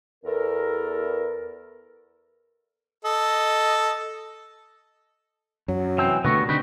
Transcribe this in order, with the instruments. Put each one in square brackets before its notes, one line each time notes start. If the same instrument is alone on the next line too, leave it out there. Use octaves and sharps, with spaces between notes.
[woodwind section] E2 A4 A#4
[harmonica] A4 D#5
[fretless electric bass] F#2 [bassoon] F#3
[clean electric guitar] C2 C4 G5 [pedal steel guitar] E3 E6
[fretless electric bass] B2 D3 A3 [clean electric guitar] B3 F#4 A#4 [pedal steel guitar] B4 C#6
[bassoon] G2
[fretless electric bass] D3 [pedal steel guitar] C4 [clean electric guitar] D#4 F#4 B5